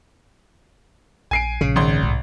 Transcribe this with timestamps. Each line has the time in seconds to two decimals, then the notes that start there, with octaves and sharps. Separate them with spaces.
1.31 A#1 G#5 C7 D7
1.61 A#1 C#3
1.76 G#1 D#3 C6
2.03 C2 A2